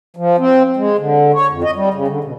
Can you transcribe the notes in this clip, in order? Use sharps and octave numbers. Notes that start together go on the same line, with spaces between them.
F3
C4
G#3
D3
C#5
F2
D#5
G3
C#3
D3
B2